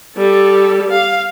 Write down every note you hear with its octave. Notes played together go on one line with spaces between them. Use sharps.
G3 A4
F5